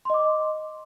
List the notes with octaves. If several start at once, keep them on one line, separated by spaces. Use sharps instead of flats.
D#5 C6 D6